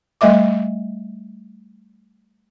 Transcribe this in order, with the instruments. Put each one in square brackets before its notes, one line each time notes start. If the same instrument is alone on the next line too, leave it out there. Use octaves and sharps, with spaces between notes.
[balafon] G3 A3 D#5 E5 D6